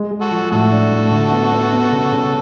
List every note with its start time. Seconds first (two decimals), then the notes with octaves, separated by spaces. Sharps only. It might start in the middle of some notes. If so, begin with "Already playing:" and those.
Already playing: G#3
0.11 G#3
0.21 F#4 A4
0.31 F3
0.51 A2 F#4 A4
0.72 D4
0.91 A2
1.11 D3
1.32 B3
1.52 B3
1.73 B3
1.92 C#3
2.12 C#3